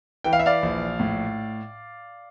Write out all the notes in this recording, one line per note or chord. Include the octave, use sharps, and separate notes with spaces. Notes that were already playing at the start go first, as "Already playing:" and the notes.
E3 G5
F5
E5
D5 F5
A#1
A2